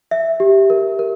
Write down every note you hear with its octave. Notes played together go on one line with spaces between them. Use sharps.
E5
G4
A#4
A#4